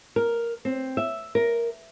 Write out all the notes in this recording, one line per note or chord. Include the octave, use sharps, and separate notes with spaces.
A#4
C4
E5
A#4